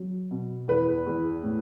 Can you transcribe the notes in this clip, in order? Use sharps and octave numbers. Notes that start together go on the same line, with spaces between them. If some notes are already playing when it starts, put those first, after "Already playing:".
Already playing: F#3
B2
E2 B4
E2
A2